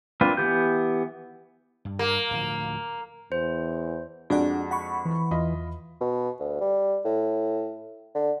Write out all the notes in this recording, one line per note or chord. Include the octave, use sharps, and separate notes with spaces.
A#3 C4 D4 F4 B4
E3 B3 G4 G6
G2
A#3
D1 D2 F3
E2 C5
F2 G#3 D4 F#4 D5 F#5
F#5 B5 C#6
E3
E2 F4 D#5 B5
B2
D2
G3
A2
D3